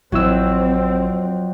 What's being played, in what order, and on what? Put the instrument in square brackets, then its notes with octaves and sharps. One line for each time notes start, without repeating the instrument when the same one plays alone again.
[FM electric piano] A1 E4 E6 [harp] F2 F#3 [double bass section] C4